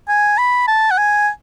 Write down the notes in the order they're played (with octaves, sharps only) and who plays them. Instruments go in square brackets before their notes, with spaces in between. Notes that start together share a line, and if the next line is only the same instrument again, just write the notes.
[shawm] G#5
B5
A5
F#5
G#5